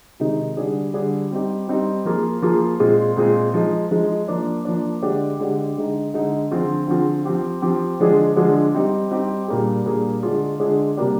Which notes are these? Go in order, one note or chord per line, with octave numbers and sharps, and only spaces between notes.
C3 D#3 G#3 D#4
D3 G3 D4 G#4
D3 G3 D4 G#4
G3 C4 D#4 G4
G3 C4 D#4 G4
F3 A#3 F4 G#4
F3 A#3 F4 G#4
A#2 G#3 C4 F4 G#4
A#2 G#3 C4 F4 G#4
F3 G#3 D#4
F3 G#3 D#4
F3 A#3 D4
F3 A#3 D4
D3 G#3 D4 G4
D3 G#3 D4 G4
D3 G#3 D#4
D3 G#3 D#4
D3 F3 C4 F4 G#4
D3 F3 C4 F4 G#4
F3 C4 G4
F3 C4 G4
D3 F3 G#3 D4 G#4
D3 F3 G#3 D4 G#4
G3 C4 D#4 G4
G3 C4 D#4 G4
A#2 G3 A#3 D4 G#4
A#2 G3 A#3 D4 G#4
D3 G#3 D4 F4 G#4
D3 G#3 D4 F4 G#4
C3 G3 A#3 D4 G4